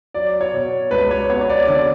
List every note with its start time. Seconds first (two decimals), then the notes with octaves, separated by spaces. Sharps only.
0.14 F#3 D5
0.41 C#5
0.53 B2
0.91 C#2 B4
1.11 C#5
1.29 B3 C#5
1.41 C#5
1.49 D5
1.67 D3 D5